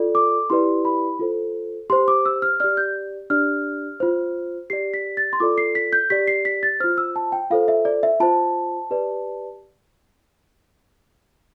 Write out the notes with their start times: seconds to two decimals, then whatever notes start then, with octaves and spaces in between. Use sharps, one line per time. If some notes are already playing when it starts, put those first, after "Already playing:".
Already playing: F4 A4 D5
0.15 D6
0.50 E4 G4 B4 D5 C6
0.85 B5
1.19 F4 A4 C5
1.90 G4 C5 C6
2.08 D6
2.26 E6
2.42 F6
2.60 G4 D5 F6
2.77 G6
3.30 D4 G4 D5 F6
4.00 F4 C5
4.70 G4 D5 C7
4.94 B6
5.17 A6
5.33 C6
5.40 F4 A4 D5 D6
5.58 C7
5.75 B6
5.93 G6
6.10 G4 D5 B6
6.28 C7
6.45 B6
6.63 A6
6.80 F4 C5 F6
6.98 E6
7.16 A5
7.32 G5
7.50 F4 A4 C5 F5
7.68 E5
7.85 D5
8.03 E5
8.20 F4 C5 A5
8.91 G4 B4 D5